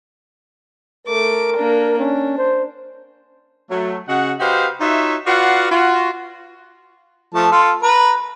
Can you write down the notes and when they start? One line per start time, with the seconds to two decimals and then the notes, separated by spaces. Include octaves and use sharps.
1.07 A3 A#4 D6
1.56 A#3 D4
1.98 C#4 D4
2.37 C5
3.70 F#3 A3
4.08 C#3 F#4 D#5 F#5
4.39 F#4 G4 B4 C5 D#5 F5
4.81 D#4 F4 F#4 C#5 E5
5.26 F4 F#4 B4 D5 F5 F#5
5.71 F4 F#4
7.34 F3 A3 A5
7.52 F4 A4
7.83 B4 A#5